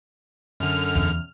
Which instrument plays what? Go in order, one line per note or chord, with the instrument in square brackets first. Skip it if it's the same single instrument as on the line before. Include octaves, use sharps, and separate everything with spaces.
[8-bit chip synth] F#2 D3 [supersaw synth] F6
[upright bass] E2 C#3